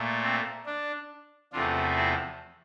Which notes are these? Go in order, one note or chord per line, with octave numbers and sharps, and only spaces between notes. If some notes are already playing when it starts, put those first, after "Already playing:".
Already playing: A#2 A3
C4
D4
E2 C3 F3 A3 D4 F4
C4 E4